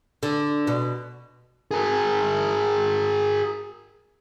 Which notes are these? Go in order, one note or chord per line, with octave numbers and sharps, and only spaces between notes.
D3
B2
G#4 A#4